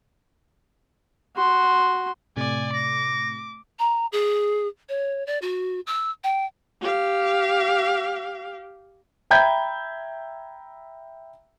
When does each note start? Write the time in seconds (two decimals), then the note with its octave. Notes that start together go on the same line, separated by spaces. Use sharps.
1.37 F#4 C6
2.37 A2 C3 A3 D5 G#5
2.73 D6 A#6
3.79 A#5
4.12 G#4
4.89 C#5
5.27 D5
5.42 F#4
5.87 E6
6.24 G5
6.81 G4 F5
9.31 E5 G5 A#5 B5 G6 G#6